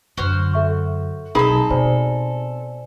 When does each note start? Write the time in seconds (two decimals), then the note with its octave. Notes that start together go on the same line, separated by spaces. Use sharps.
0.17 F#2 D3 F#4 C5 F6
0.53 A4 E5 C#6
1.35 B1 C4 D#4 G#4 A4 B5
1.70 B2 C5 D5 G#5